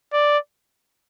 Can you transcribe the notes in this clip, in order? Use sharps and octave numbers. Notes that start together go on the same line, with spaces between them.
D5